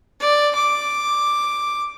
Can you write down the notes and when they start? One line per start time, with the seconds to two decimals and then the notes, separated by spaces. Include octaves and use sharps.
0.20 D5
0.55 D6